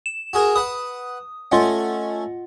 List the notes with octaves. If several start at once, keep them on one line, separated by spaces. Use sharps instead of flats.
E7
F#4 G#4 A#4
B4 F#5 D#6
A3 C#4 F4 D#5 F#5